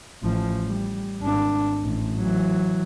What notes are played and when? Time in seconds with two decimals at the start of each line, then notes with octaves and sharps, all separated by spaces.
0.23 A1 F3
0.66 G3
1.20 G#1 D4
1.84 A1
2.17 E3 F#3